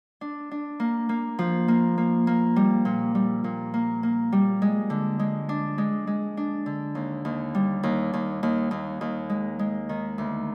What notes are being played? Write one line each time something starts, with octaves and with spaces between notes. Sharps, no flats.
D4
D4
A#3
A#3
F3
A#3
A#3
A#3
G3
A#2
G3
A#2
A#3
A#3
G3
G#3
D3
G#3
D4
G#3
G#3
D4
D3
D#2
D#2
G3
D#2
D#2
D#2
D#2
D#2
G#3
G#3
D#3
D2